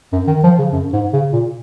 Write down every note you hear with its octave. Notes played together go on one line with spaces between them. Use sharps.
F#2
D#3
F3
C#3
F#2
G#2
C#3
A#2